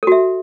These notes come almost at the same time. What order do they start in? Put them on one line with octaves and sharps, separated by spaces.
A4 F#4 E5